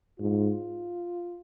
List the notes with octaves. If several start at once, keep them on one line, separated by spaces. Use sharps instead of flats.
G#2 F4